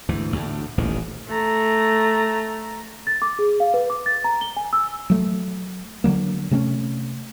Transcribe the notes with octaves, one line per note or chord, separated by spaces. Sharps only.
D2 G#2 E3
D2 A2
D#1 A1 D#2 D#3
A3 A#5
A6
D6
G#4
F5
B4
D6
A6
A#5
G7
G#5
E6
F#3 A3
D3 D#3 F#3 A#3
C3 A3 B3 C#4